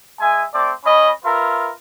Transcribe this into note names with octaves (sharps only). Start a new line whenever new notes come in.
G#3 E5 G#5
A3 C4 D5 D6
C#4 D#5 B5
F4 A#4 B4 E5